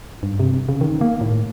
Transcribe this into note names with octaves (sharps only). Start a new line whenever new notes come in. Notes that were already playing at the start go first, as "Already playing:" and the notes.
G2
C3
C#3
D#3
A#3
A2